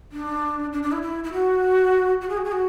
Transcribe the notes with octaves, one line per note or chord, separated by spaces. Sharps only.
D4
D4
D4
E4
E4
E4
F#4
F#4
G#4
F#4
G#4
F#4